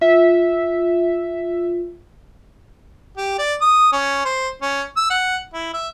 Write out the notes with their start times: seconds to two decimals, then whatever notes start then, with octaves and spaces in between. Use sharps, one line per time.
0.01 F4 E5
3.17 G4
3.38 D5
3.61 D#6
3.92 C#4
4.25 C5
4.62 C#4
4.97 E6
5.10 F#5
5.54 E4
5.73 E5